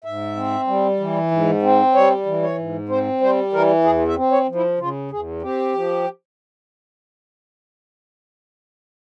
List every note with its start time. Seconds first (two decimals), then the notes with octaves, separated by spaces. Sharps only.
0.04 G#2 E5
0.36 C4
0.67 G3
1.00 E3
1.31 G#2
1.62 C4
1.95 G3 C#5
2.26 E3
2.42 C#5
2.58 G#2
2.89 C4 C5
3.21 G3 C5
3.53 E3 A#4
3.84 E2 G#4
4.08 E5
4.16 C4
4.32 C#5
4.48 F3
4.55 E4
4.79 C#3 F4
5.11 E2 G#4
5.42 C4 G4
5.74 F3